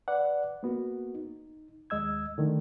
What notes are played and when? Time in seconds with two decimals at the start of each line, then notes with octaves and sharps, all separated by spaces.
0.08 B4 D5 F#5
0.63 A#3 B3 F#4
1.15 D#4
1.90 D#2 G#3 D#5 E6 G#6
2.38 D3 D#3 A3